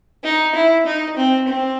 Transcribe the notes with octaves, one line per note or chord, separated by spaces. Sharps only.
D#4
E4
D#4
C4
C4